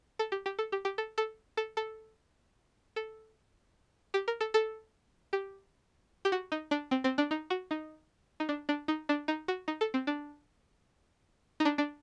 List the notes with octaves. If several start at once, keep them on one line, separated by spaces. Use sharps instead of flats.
A4
G4
G4
A4
G4
G4
A4
A4
A4
A4
A4
G4
A#4
A4
A4
G4
G4
F#4
D#4
D4
C4
C4
D4
D#4
F#4
D#4
D#4
D4
D4
D#4
D4
D#4
F#4
D#4
A4
C4
D4
D#4
D4
D4